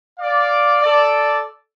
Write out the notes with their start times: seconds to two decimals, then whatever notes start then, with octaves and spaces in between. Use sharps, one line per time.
0.19 D5 F5 D6
0.82 A4 D5